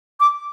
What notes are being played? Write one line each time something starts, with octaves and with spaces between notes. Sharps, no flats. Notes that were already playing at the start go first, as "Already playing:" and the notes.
D6